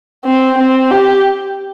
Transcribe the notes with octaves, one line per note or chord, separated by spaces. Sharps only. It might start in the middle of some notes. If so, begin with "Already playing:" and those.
C4
C4
G4